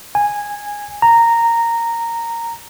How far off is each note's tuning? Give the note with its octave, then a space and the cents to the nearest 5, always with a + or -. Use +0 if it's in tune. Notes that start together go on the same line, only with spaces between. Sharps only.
G#5 -10
A#5 -10